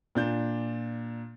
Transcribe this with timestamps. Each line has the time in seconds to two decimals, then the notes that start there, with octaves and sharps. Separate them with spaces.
0.15 A#2 D4 G6